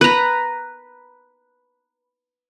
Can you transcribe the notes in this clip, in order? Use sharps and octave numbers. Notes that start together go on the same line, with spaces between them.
B4 A#5